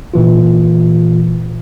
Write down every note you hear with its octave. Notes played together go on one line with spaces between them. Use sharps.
A#2 E3 F4